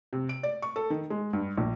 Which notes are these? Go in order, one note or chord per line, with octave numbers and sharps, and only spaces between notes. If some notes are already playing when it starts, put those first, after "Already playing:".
C3
D7
D5
C#6
A4
D#3
G#3
G2
A#1